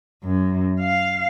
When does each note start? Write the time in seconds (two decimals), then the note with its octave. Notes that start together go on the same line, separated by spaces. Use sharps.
0.24 F#2
0.80 F5